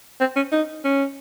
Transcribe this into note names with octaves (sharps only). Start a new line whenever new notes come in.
C4
C#4
D#4
C#4